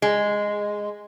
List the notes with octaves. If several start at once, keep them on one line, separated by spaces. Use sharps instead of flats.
G#3